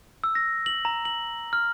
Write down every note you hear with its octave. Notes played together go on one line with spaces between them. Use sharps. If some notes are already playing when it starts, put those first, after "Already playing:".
E6
A#6
F#7
A#5
F#7
F6